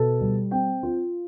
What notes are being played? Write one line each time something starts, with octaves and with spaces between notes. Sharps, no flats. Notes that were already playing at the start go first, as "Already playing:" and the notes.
Already playing: B2 A4
G3
C4 G5
F4